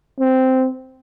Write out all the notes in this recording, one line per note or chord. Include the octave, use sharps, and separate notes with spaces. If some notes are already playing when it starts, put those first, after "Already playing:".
C4